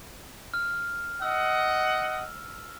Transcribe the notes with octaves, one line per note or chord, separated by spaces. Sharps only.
F6
D#5 F#5 E6